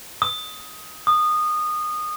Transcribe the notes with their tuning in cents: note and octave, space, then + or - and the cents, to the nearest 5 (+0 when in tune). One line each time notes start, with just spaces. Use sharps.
D#6 +15
D#6 -20